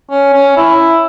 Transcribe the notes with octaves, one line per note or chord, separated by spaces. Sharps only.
C#4
C#4
E4